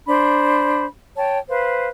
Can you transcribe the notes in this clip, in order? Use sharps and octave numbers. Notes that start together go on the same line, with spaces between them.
D4 C5 B5
C#5 G5 A5
B4 C5 F5